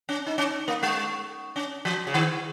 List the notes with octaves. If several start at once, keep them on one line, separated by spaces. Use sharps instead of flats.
C#4
D#4
C#4
A#3
G#3
C#4
F3
C#3
D#3